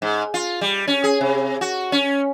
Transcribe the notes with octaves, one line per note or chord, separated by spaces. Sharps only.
G#2
F4
G3
C#4
G#4
C3
F#4
C#4